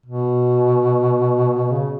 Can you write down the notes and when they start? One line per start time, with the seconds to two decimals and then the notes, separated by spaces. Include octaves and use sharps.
0.06 B2
1.70 C#3